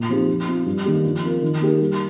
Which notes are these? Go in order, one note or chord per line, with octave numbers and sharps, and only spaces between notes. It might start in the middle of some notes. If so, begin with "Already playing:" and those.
Already playing: A#2
F3 C4 D#4 G4
F3
C4 F4
G2
D#3 A#3 D4 G4
F3
C4 F4 A#4
D#3
A#3 D#4 G4 A#4
G3